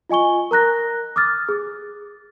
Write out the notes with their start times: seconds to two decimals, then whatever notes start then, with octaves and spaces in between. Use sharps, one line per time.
0.09 F4 D#5 G#5 C#6 G7
0.51 A#4 A#5 F#6 A#6
1.16 D6 D#6 F6 A6
1.49 G#4